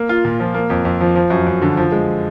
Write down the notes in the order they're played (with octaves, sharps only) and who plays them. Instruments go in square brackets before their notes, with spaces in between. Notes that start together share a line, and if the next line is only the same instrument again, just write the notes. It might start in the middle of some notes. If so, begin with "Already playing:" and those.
Already playing: [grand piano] A#3
F4
A#2
F3
A#3
F2
F2
F3
F3
F#2
F#2
D3
F3
G#3